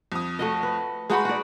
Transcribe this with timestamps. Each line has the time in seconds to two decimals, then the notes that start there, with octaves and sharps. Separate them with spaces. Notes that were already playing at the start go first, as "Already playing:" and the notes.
0.12 F2 D#6
0.39 A3 F#4 D#5
0.63 B4
1.10 G#3 D#4 F#4 G#4 F#5 B5
1.25 F#4 D5